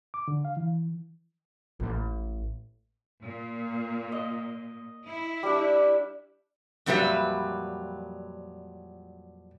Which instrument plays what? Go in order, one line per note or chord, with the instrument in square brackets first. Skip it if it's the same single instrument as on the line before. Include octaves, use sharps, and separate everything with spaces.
[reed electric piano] D6
D3
F5
E3
[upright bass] A1
[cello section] A#2
[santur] D#5
[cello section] E4
[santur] G3 D4
[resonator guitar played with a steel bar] F2 A#2 F#3 G3 B4 E5